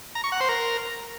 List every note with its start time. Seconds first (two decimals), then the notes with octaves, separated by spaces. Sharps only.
0.15 A#5
0.24 C#6
0.32 F#5
0.40 C5
0.49 A#4